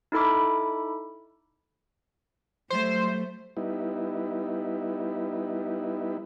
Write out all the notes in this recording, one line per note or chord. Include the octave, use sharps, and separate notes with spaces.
D#4 E4 A4 B5 D6
F#3 G3 A3 C5
G3 B3 D#4 E4